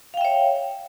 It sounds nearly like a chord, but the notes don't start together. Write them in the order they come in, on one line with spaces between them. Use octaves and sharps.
F5 G5 E5 C#5